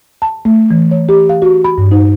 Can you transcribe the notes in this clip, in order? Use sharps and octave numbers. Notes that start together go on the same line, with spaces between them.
A5
A3
E3
C#5
G4
F5
F#4
B5
G2
D#4